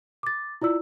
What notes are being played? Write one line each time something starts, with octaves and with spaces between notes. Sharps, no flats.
D6 A6
E4 F4 D5 E6